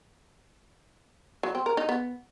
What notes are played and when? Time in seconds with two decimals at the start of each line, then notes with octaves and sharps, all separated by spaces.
1.43 F#3
1.55 C4
1.66 A#4
1.77 D#4
1.89 B3